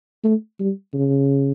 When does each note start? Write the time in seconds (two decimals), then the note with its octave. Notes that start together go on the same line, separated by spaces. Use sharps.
0.24 A3
0.60 G3
0.94 C#3